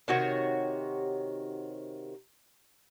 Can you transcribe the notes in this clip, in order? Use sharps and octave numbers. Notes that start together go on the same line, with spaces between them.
C3 D#3 F#4 C#5